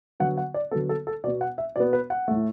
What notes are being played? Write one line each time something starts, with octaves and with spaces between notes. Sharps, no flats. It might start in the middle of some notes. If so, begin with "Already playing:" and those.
D3 F#3 B3 F#5
F#5
D5
D3 F#3 B3 A4
A4
A4
B2 B3 D5
F#5
E5
B2 B3 D5
B4
F#5
A2 A3